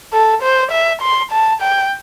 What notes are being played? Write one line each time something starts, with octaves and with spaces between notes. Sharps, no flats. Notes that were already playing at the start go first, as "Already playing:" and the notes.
A4
C5
E5
C6
A5
G5